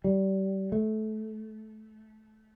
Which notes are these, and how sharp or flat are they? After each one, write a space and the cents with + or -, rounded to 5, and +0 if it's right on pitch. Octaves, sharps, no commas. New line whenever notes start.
G3 -25
A3 -20